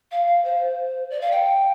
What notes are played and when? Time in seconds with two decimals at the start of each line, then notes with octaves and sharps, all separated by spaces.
0.11 F5
0.27 F5
0.44 C5
1.10 D5
1.21 F5
1.31 G5